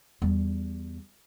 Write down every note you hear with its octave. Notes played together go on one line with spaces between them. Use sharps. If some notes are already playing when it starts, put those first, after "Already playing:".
E2 G3